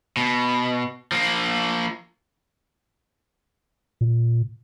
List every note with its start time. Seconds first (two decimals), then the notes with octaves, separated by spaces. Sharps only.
0.17 B2
1.12 F3 A#3
4.01 A#2